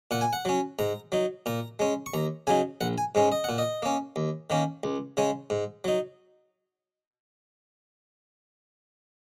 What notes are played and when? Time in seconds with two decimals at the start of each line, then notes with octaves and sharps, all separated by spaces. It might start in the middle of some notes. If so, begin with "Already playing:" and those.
0.11 A#2 F#5
0.21 G#5
0.33 F#5
0.45 F#3 C#4
0.79 G#2 A#5
1.12 F#3 D#4
1.46 A#2 A#5
1.79 G#3 C#4
2.06 C#6
2.14 D#2 A#5
2.47 C#3 F#3 D#4 G#5
2.81 A#1 F#5
2.98 G#5
3.15 G#2 G#3 C#4
3.32 D#5
3.44 A#2 F#5
3.58 D#5
3.82 A#3 C#4
4.16 D#2
4.50 D#3 A#3 C#4
4.83 C#2
5.17 C#3 G#3 C#4
5.50 G#2
5.84 F#3 D#4